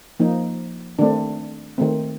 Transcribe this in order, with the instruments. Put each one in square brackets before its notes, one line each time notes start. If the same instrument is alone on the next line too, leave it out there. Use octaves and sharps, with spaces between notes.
[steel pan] F3 A#3 D#4
D#3 A3 C4 D4
D#3 A3 C4